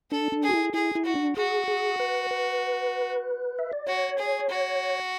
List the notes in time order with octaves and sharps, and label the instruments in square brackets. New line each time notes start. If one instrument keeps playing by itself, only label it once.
[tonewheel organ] D4 [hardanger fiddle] A4
[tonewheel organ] D4
[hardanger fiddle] G#4
[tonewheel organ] F#4
E4
[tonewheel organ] E4 [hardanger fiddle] G#4
[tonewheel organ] E4
[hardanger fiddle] F#4
[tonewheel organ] D4
[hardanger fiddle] F#4 [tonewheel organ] G#4
[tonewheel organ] G#4
B4
B4
E5
D5
[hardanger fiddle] F#4 [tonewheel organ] C#5
[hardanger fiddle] G#4
F#4